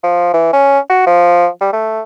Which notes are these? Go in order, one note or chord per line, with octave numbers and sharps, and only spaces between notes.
F3
E3
C#4
F#4
F3
G3
A3